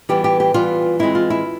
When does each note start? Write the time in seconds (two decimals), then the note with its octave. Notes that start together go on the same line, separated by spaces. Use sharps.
0.09 E3 G3 B3 G4
0.24 G4
0.40 G4
0.54 E3 G3 B3 F4
0.99 E3 G#3 C4 D#4 E4
1.15 F4
1.30 E4